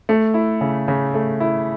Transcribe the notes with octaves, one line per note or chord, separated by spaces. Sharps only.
A3
E4
C#3
C#3
A3
E4